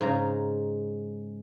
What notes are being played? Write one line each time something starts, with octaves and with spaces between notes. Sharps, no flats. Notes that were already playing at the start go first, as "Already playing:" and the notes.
G#2 C#3 A#5